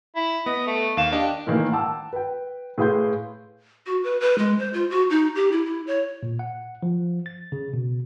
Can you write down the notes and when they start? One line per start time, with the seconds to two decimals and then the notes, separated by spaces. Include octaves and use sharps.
0.16 E4
0.46 B3 D#5
0.67 A3
0.97 D#2 F5 E7
1.12 D4 G4 D#5
1.47 A2 D#3 E3 A#3 D4
1.72 F#5 G5 A5 D6 E6
2.13 B4 G5
2.78 A2 G#4 B4 F5 C6 G6
3.86 F#4
4.04 B4
4.20 B4
4.38 G#3
4.59 C5
4.74 F4
4.90 F#4
5.10 D#4
5.35 G4
5.52 E4
5.65 E4
5.87 C#5
6.23 A#2
6.39 F#5
6.83 F3
7.26 A6
7.52 C#3
7.73 B2